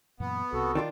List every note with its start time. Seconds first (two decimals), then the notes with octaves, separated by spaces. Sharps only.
0.20 F#2 A#2 E3 B3
0.53 C2 C3 F#4 A4
0.75 D#3 D4 F4